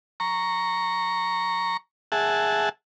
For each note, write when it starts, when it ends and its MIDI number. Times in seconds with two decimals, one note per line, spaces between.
0.20 1.77 82
0.20 1.77 85
2.12 2.69 68
2.12 2.69 76
2.12 2.69 78
2.12 2.69 81